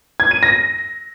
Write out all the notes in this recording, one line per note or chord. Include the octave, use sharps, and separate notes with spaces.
G#6
D#7
A#6